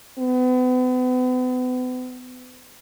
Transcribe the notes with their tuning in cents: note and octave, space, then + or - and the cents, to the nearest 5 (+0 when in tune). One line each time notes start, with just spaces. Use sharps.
B3 +40